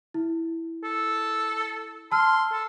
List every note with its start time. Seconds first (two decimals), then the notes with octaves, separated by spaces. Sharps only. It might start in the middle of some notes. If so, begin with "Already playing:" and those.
0.14 E4
0.84 A4
2.12 A5 C6 E6 F6
2.52 A4